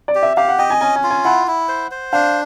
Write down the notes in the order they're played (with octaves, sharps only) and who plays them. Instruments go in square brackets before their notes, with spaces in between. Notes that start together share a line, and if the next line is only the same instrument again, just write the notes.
[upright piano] D5
[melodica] G4
[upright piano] E5
[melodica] G4 [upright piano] F5
[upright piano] F#5
[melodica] D#5 [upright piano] G5
[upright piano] G#5
[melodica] C#4 [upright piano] G#5
[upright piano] G#5
[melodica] F4
[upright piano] G#5
[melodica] E4 [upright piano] F#5
[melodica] E4
C5
C5
[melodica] D4 [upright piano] F5